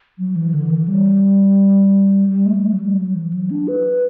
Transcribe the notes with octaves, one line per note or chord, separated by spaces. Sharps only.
F#3
E3
D3
E3
G3
G3
A3
G3
A3
F#3
G3
F#3
E3
F#3
D4
B4